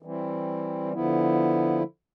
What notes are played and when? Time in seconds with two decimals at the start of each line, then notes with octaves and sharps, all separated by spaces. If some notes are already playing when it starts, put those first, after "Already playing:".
0.02 E3 G3 C4 E4
0.93 D3 F3 B3 E4